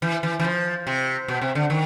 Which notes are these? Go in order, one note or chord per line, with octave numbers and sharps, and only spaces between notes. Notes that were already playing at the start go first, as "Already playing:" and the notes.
E3
E3
E3
F3
C3
B2
C3
D3
D#3